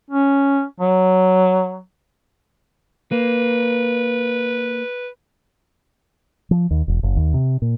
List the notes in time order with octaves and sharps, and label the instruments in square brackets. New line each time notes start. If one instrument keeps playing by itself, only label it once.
[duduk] C#4
F#3
[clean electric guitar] A#3 [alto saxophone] B4
[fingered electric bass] F3
D#2
E1
F#1
D#2
C3
A#2